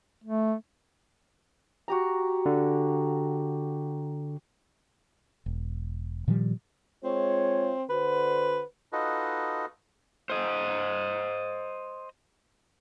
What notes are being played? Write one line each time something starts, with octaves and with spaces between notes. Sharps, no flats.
A3
F#4 G4 A#5
D3
E1
A#2 D#3 F3 G3
G#3 C4 F4 C#5
D3 F#4 B4 C5
D#4 F4 F#4 A4 B4 D#5
C5 D#5